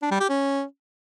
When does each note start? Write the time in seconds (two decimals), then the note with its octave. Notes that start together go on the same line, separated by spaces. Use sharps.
0.02 D4
0.11 G3
0.20 G4
0.29 C#4